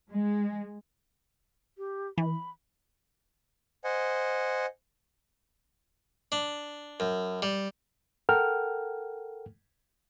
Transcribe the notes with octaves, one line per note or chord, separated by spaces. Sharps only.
G#3
G4
E3 B5
C5 D#5 F#5 G#5
D4
F#2
G3
A4 A#4 F#5 G5 F6